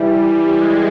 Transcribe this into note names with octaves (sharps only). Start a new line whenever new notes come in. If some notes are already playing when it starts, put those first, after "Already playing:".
Already playing: E3 G3
G#3